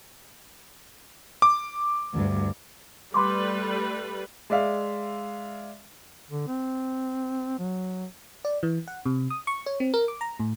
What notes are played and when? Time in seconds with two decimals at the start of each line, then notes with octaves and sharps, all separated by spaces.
1.42 D6
2.14 D2 G2
3.14 G3 A3 B4 B5 C6 D6
4.50 G#3 D5 E5 F5
6.31 D3
6.48 C4
7.59 F#3
8.45 D5
8.63 E3
8.88 F#5
9.05 C3
9.30 D#6
9.47 C#6
9.66 C#5
9.80 C4
9.94 A#4
10.08 D6
10.21 A#5
10.39 A2